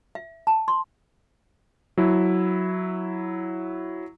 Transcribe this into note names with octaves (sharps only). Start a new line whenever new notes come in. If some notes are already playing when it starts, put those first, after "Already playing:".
E5
A5
C6
F#3 E4